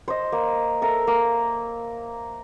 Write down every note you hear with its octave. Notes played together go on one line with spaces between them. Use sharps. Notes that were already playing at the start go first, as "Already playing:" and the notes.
C5 D#5
A#3
A4 A#4 E5
A#3